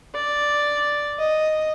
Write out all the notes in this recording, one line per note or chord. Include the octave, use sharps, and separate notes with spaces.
D5
D#5